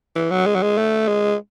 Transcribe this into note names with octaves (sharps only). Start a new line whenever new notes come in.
E3
F#3
G#3
F#3
G#3
A3
G#3